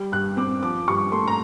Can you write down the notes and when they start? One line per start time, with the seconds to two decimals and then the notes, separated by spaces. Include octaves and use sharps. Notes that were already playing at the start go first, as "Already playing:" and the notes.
Already playing: G3
0.12 G2 F#6
0.37 C4 D6
0.62 F3 D6
0.88 G2 C#6
1.12 A3 C6
1.28 A#5